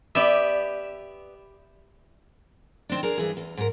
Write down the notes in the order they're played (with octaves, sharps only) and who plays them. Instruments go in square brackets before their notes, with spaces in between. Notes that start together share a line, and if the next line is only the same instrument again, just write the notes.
[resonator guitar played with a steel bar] B3 B4 D5 [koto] G4 E5
[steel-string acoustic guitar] D#3 C4 D4
D4 G#4 A#4
G2 E3 G#4
E2
G#2 A#4